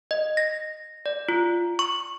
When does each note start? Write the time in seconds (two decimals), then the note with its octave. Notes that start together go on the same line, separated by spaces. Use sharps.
0.11 D#5
0.37 A#6
1.06 D5
1.29 F4
1.79 C#6